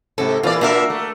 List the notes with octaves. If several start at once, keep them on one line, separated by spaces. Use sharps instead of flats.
G#2 C3 A4
A#2 E3 F4 D5
A#2 A#3 D4 F#4 A#4 E5
A3